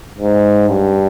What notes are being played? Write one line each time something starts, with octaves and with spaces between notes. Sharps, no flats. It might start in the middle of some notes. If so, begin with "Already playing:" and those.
G#2
G2